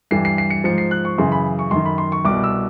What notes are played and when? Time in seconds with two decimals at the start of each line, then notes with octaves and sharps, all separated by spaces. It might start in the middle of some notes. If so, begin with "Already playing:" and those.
0.11 G2 E3 C7
0.25 C7
0.38 C7
0.50 C#7
0.64 G#2 F3 C#7
0.78 C7
0.91 F#6
1.05 C#6
1.18 F#2 C#3 E3 C6
1.32 B5
1.59 C#6
1.71 F#2 D#3 C6
1.86 B5
1.98 C6
2.12 C#6
2.25 C2 B2 D6
2.44 E6